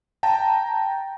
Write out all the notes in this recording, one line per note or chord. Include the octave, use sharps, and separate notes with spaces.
G5 A5 A#5